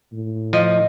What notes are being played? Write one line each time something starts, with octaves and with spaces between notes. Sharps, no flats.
A2
F3 D#5